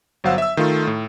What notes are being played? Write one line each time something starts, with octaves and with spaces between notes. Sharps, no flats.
G1 F#3 C5 F5 F#5 E6
E5 E6
D#3 A3 F4 A4
A2